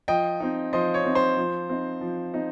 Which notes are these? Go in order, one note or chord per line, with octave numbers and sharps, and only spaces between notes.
F3 D#5 G5
C4 D#4
F3 C5 D#5
C#5
C4 D#4
C5
F3
C4 D#4
F3
C4 D#4